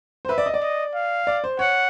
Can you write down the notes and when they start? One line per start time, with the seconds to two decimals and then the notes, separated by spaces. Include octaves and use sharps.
0.25 C5
0.29 B4 E5
0.38 D5
0.46 D#5
0.54 D5
0.62 D#5
0.94 F5
1.27 D5
1.44 C5
1.59 C#5 F#5